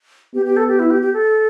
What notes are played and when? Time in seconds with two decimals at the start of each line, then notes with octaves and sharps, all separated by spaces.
0.34 B3 G4
0.46 G4
0.57 A4
0.68 G4
0.79 E4
0.91 G4
1.02 G4
1.14 A4